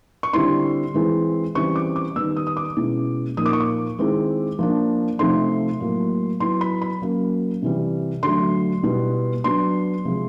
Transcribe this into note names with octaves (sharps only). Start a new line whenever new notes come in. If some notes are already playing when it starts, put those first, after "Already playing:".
C#6
D3 G3 C4 E4 C6
E3 G#3 C4 E4
C#3 E3 G3 C4 C#6
D6
D6
D#3 G3 B3 E6
D#6
D#6
D6
B2 G#3 C#4 E4
A#2 F3 A#3 D#4 D#6
D6
C#6
D6
D#3 G#3 C4 E4
F3 A#3 D4
C3 F3 A3 C4 D#4 C6
A2 F#3 A#3
F#3 B3 E4 C6
B5
B5
F#3 A#3 C#4
C3 E3 G3
D3 F#3 A3 C6
B2 G3 B3 E4
F#3 B3 D4 C6
C3 F3 G#3